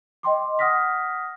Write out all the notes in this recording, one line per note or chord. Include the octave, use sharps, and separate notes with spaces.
D#5 G5 C6 D6
F#5 D#6 F6 A#6 B6